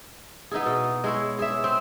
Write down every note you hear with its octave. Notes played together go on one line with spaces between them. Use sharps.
B3 D#4 E4 G#4
B2
G#3 E4 C#5
G#4 C#5 E5
C4